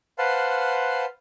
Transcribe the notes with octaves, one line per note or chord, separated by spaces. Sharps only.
B4 C5 F5 F#5 A5 C6